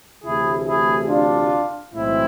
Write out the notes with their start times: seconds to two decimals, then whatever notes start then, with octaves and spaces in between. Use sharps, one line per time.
0.24 D2 C3 E3 A3 E4 G#4
0.66 E4 G#4
1.08 D4 F4
1.91 B1 A2 E3 G#3 C4 E4